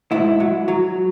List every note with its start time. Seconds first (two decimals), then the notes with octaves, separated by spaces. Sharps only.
0.11 G#2 E4
0.40 F#3
0.68 F#3